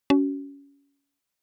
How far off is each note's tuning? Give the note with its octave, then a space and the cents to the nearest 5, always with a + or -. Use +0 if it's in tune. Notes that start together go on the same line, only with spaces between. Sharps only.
C#4 +20 F#4 +30